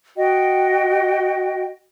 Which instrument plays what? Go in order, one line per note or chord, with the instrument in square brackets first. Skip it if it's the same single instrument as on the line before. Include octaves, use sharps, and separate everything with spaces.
[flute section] F#4 D#5 G5